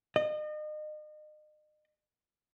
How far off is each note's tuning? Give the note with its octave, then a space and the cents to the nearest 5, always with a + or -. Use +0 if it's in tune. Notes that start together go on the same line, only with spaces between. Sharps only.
D#5 -35